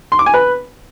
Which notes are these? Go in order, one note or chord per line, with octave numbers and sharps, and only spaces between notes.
C6
D6
G#5
B4